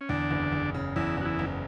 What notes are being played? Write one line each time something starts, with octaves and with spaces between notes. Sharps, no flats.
C#4
E2 D3 D4
F#1
F#1
C#3
E2 E3 E4
F#1 F#4
E3 E4
F#1